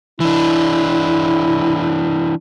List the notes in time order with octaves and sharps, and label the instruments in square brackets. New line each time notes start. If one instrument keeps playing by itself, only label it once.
[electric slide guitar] E3 D4 [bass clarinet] E4